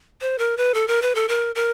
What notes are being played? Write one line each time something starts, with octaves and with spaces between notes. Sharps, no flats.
C5
A#4
B4
A4
A#4
B4
A4
A#4
A#4